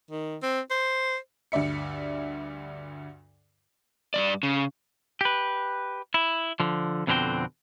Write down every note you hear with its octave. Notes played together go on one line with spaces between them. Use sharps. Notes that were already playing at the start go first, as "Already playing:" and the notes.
D#3
C4
C5
D2 G2 D5 E5 C#7
G2 D#3 D5
C#3
G4 B4
E4
D3 F3
F2 B2 D3 C4 F#4 G5